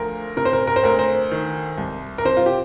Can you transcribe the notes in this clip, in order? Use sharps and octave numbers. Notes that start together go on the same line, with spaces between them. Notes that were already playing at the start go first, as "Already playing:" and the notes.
Already playing: D2 F3 A#4
C3 A#4
C5
A#4
A#4
C5
D2 A#4
C5
D#3
C2
A#4
C3 C5
F4
G4